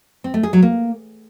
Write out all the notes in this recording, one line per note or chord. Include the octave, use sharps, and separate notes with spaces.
C4
A3
G#4
F#3
A#3